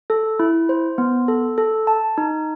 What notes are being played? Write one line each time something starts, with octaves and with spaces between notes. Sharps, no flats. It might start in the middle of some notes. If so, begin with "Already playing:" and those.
A4
E4
C5
B3
A4
A4
A5
D#4